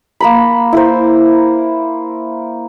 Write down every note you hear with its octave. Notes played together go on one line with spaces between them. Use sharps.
A#3 A#4 B5
E4 A#4 C5